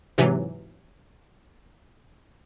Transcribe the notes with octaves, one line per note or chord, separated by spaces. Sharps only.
G#2 C3 E3 F#3